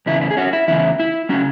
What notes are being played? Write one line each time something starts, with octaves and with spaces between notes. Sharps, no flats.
E2 C#3 E4
E4
G#4
C#4 F#4
E4
E2 C#3 E3 E4
E4
C#3 G#3 C#4 F#4